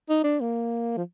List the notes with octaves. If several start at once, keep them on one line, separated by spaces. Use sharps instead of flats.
D#4
D4
A#3
F3